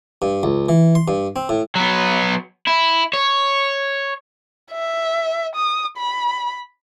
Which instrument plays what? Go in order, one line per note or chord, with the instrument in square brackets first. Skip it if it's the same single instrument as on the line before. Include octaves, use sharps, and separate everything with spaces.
[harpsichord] G2
C#2
E3
C6
G2
C4
A2
[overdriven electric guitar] F#3 B3
E4
C#5
[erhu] E5
D#6
B5